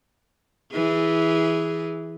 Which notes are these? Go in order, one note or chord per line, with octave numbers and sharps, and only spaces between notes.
E3 G#4